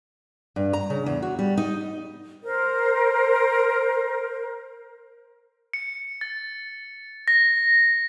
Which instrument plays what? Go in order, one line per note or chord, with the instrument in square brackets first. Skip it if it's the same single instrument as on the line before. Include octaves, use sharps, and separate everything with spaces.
[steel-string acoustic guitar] G2
A#5
C#3
E2
F#4
G3
D#4
[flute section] A#4 C5
[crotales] C#7
A6
A#6